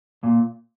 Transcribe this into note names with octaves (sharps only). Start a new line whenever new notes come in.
A#2